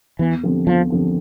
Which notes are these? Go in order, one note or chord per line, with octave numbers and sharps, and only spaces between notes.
E2 E3
D3 F3 C4
E2 F3
D3 F3 C4